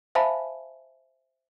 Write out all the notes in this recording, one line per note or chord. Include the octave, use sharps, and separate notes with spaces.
C5 E5 F5 G#5 A5 B5